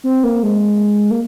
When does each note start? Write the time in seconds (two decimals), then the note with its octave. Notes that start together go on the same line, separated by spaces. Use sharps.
0.04 C4
0.24 A#3
0.43 G#3
1.11 A#3